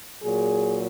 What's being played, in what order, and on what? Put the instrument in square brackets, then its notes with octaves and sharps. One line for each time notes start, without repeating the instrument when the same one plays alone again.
[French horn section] A#2 F#3 G#4